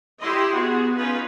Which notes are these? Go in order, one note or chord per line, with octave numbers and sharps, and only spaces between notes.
E4 G4 D#5 C6
B3 F#4 G#4
C#4 D#4 F4 B4